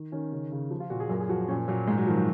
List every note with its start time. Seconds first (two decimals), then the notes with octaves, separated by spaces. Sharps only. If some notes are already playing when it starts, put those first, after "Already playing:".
Already playing: D#3
0.12 D#3 C#4
0.32 C#3 C#4
0.52 C#3
0.70 F3
0.80 F4
0.90 A#2 F#4
1.00 G#4
1.09 F#2 A#4
1.20 G#4
1.29 F3 F#4
1.48 A#2 C#4
1.68 A#2 F#3
1.87 G#2 G#3
1.97 F#3
2.07 D#3 F3
2.16 F#3